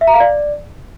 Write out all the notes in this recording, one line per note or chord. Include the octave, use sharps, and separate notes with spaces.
E5
A#5
F5
D5